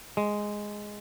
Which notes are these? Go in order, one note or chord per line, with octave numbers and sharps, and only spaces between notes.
G#3